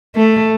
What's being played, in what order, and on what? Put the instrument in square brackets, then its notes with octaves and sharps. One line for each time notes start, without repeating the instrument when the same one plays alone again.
[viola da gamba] A3